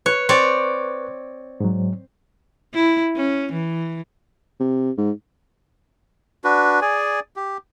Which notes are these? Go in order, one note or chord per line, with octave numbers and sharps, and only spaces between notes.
B4 C#5 C#6 F#6
C4 C#5 D5
G#2 F#3
E4
C#4
E3
C3
G#2
D4 F#4 B4
G#4 D5 G#5
G4